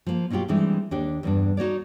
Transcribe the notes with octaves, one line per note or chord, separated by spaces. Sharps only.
F3 A#3
B2 F#3 E4 F4 G4
E3 G3 G#3 C4 D4 D#4
D#2 D4 G4
E2 G2 D4
D#4 F#4 C#5 D5